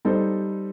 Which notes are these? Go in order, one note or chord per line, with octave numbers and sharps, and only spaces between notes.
G3 D#4 A4 C5